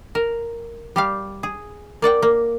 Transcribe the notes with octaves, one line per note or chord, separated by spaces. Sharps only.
A#4
G3 G4 F5
G#4
A#3 D5 F#5 G5
A#3